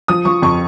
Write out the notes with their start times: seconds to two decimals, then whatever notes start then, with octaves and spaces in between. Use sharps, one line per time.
0.08 F3 D#6
0.25 F3 C#6
0.42 F2 C#6